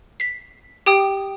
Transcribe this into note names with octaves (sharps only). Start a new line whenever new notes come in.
B6 C7
G4 G5 D#6